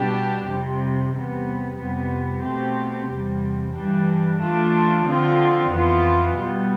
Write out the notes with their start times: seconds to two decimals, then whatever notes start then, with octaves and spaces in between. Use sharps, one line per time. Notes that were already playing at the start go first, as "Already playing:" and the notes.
Already playing: B2 G3 D4 G4
0.47 F2 C3 G3
1.13 E2 C3 G3 B3
1.78 F2 C3 G3 B3
2.44 B2 A3 C4 G4
3.09 E2 C3 G3
3.75 G2 E3 G3 D4
4.41 E3 A3 D4 F4
5.06 D3 F3 C4 F4
5.71 F2 E3 B3 F4
6.37 B2 G3 B3